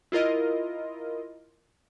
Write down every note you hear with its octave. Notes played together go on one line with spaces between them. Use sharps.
E4 F4 A#4 D#5